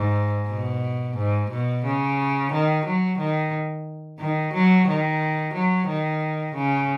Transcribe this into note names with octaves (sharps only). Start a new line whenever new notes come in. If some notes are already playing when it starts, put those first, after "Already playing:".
Already playing: G#2
B2
G#2
B2
C#3
D#3
F#3
D#3
D#3
F#3
D#3
F#3
D#3
C#3